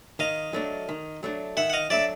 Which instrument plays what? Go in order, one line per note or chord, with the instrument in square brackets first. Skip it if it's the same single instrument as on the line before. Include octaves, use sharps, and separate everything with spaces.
[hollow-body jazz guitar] D#3 [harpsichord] D#5 F5
[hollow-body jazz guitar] F#3 A3 D4
D#3
F#3 A3 D4
[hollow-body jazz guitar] D#3 [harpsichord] E5 F#5
[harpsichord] F#5
D#5 F5
[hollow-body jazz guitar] F#3 A3 D4 [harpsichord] D5 E5